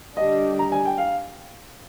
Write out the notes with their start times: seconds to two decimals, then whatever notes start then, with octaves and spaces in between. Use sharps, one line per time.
0.16 D3 G3 D4 D#5
0.59 A#5
0.72 G#5
0.85 G5
0.98 F5